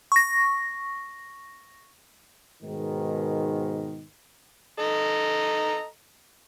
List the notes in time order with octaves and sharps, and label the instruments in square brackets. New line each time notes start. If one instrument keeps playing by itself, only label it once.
[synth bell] C#6 A#6
[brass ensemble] G#2 B2 D#3
[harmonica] A4 D#5 A#5